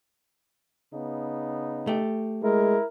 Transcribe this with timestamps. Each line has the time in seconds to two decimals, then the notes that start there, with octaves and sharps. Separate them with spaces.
0.92 C#3 B3 D#4
1.87 A3 G4
2.43 G#3 E4 A#4